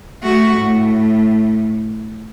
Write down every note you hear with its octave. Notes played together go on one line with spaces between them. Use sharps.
A3 F#4
A2